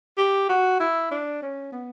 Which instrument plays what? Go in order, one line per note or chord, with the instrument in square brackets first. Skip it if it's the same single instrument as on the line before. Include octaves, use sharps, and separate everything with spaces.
[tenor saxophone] G4
F#4
E4
D4
C#4
B3